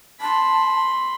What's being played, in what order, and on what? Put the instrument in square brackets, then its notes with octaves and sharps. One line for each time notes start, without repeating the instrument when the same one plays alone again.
[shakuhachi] A5 [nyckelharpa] B5 C6